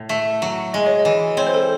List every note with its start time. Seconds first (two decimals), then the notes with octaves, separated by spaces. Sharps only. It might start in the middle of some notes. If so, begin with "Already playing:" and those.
Already playing: A2
0.09 A3 E5
0.42 F#3
0.74 G#3 D#5
0.87 C#5
0.99 D#5
1.05 E3
1.37 C4 C#5
1.47 C5
1.54 A4